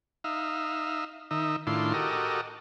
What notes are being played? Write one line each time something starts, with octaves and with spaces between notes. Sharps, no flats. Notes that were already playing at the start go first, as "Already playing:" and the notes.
D#4 E5 F5
D#3 D#4 E5
A2 D#3 D4 E4 F4 C6
F#4 G4 A4 A#4 D#5